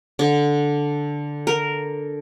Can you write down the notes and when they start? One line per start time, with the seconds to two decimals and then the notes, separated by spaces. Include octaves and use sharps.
0.19 D3
1.47 A#4